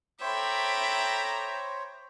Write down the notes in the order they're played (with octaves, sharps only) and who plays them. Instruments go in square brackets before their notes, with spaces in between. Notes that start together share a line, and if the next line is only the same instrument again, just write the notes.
[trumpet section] A4 B5 D6 [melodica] C5 C#5 [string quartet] E5 G5 [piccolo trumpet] A#5